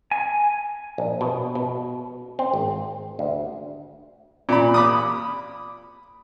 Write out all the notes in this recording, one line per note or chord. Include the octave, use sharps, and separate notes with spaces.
G#5
A#1
B2
B2
C4
G#1
D2
A#2 B5
B5 D6 D#6